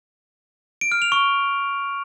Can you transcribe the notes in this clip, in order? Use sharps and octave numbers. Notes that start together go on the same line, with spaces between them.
D7
F6
F7
C#6